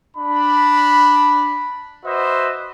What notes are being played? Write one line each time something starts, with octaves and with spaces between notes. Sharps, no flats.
D4 B5
F#4 B4 C5 D#5 E5